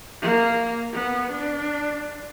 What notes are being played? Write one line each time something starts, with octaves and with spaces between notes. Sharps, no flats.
A#3
B3
D4